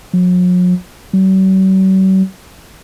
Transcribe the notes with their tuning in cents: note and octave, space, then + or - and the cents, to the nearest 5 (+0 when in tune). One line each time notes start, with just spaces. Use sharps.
F#3 -45
F#3 +45